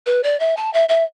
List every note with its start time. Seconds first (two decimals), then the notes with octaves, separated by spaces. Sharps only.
0.06 B4
0.23 D5
0.40 E5
0.57 A5
0.74 E5
0.89 E5